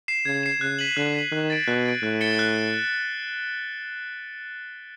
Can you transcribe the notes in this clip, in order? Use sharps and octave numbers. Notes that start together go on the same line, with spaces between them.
C7 E7
C#3 G#6
C7 E7
C#3 F#6
B6 D#7 F#7
D3 F#6
B6 D#7 F#7
D#3 F#6
A6 D7
B2 F#6
A6 D7
A2 F#6
A6 C#7 E7 G7
F#6